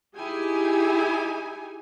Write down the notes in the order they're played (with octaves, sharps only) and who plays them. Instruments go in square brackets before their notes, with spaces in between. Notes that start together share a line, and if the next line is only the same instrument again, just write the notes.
[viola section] D#4 E4 G4 G#4 G#5